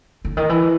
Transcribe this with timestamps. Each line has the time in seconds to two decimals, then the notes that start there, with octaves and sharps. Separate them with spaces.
0.25 D3
0.37 D#3
0.49 E3